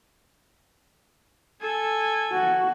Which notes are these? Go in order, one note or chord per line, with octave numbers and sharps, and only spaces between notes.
A4 G#5
F#4